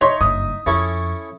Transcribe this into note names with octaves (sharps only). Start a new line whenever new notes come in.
D#4 C#5 E5 C6
F#1 G2 D#6
F2 C#4 E4 A4